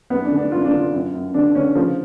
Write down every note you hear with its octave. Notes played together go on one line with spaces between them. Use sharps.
F#2 B3
D4
D3
D4
F#2 F4
D4
D3
F4
F#2
F#2
D3 D4
D3 C#4
C#3 F3